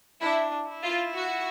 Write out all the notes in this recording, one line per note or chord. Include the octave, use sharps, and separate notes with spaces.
D4 E4
E4
F4
F#4